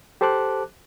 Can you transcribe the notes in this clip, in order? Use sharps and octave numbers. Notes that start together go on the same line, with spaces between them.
G4 A4 C5 A5 D6 F#6